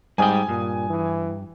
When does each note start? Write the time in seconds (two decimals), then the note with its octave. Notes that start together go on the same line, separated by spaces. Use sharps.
0.18 G#2 G3 G5 G#5 D#6
0.49 G2 A#2
0.89 E3